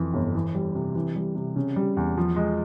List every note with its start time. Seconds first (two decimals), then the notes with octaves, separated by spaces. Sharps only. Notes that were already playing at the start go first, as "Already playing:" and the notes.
Already playing: F2 E3
0.14 G1
0.35 E3
0.54 G3
0.75 C3
0.95 E3
1.16 G3
1.35 C3
1.56 C#3
1.76 G3
1.97 E2
2.17 F3
2.36 G#3